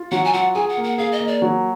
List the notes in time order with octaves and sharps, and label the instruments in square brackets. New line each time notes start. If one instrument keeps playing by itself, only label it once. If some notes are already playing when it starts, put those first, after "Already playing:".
Already playing: [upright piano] F4
[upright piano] F#3 [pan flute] F#5
[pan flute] G#5
[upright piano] F4 [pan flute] F#5
[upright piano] G#4 [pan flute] G#5
[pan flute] F#5
[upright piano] A#3
[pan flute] F#5
[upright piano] G#4 [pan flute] F5
[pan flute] D#5
[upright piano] A#3
[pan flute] D5
[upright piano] F#3